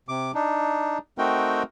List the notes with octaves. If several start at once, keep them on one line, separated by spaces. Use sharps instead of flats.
C3 D6
D4 D#4
A3 C4 D#4 F#4 A#4 G5